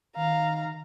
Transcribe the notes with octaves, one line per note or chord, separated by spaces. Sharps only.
D#3 F5 A#5